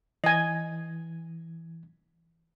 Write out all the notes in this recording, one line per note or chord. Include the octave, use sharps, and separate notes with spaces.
E3 D#5 G#5